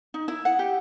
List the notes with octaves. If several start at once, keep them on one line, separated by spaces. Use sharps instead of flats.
D#4
E4
F#5
G4